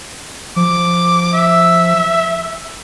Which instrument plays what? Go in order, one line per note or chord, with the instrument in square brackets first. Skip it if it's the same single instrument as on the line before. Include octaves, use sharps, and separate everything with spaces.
[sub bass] F3 [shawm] D6
[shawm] E5